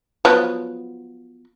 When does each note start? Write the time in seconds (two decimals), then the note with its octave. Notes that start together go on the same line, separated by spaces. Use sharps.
0.25 F3 F#3 B3